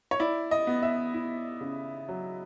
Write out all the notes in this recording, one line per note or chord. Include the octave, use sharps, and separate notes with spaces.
C#5
E4 D5
D#5
B3
E5
E4
C#3
F#3